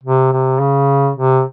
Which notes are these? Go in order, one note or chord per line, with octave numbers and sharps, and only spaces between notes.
C3
C3
C#3
C3